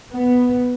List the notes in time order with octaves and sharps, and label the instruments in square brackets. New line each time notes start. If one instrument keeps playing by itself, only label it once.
[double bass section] B3